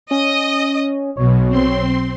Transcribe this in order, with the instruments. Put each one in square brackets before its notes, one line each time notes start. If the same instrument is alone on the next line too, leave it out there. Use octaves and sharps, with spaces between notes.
[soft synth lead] C#4 [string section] D#5
[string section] B1 [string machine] B2 [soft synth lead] C#5
[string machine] C4 C6